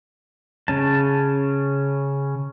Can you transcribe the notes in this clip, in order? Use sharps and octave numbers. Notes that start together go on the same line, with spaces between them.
C#3 C#4 A5